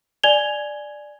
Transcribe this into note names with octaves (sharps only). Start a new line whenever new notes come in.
D5 G#5 G#6 F7 G7